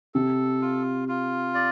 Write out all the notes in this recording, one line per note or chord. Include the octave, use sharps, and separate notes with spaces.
C3 A4
F4
F4
D5